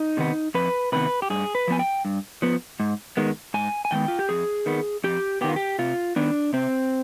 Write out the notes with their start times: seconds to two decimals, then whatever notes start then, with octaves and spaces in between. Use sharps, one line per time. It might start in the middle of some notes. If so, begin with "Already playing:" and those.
Already playing: D#4
0.17 C3 D#3 B3
0.54 F2 B4
0.92 C3 D#3 B3 B4
1.22 G4
1.30 G2 G#4
1.55 B4
1.67 F3 B3 G#5
1.79 G5
2.05 G2
2.42 F3 B3
2.80 G#2
3.17 D#3 G#3 B3
3.54 G#2 G#5
3.85 G#5
3.91 D#3 G#3 B3 G5
4.08 F4
4.19 G4
4.29 F2 G#4
4.66 D#3 B3
5.04 F2 G4
5.41 D#3 B3 G4
5.49 F4
5.56 G4
5.79 C3 F4
6.16 D#3 B3 D4
6.53 C3 C4